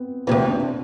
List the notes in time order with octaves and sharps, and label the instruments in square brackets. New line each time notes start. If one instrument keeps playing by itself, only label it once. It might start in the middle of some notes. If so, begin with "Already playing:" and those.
Already playing: [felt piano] B3 C4
[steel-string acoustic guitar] D2 C3 E3 [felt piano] A#3 C4
[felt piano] C4 D4